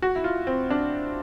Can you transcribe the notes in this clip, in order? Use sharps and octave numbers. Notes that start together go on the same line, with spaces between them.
F#4
E4
F4
C4
D4